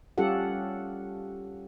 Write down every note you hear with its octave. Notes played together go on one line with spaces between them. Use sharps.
G3 C#4 F4 G4 A4 F#5